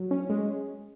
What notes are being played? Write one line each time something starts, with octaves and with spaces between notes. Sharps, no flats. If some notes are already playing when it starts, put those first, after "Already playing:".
Already playing: F#3
C#4
G#3